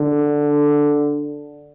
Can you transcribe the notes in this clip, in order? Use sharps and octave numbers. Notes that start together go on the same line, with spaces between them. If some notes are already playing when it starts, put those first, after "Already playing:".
Already playing: D3